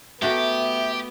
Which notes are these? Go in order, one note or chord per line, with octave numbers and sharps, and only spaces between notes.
A3 B3 F#4 G4 E5 A#5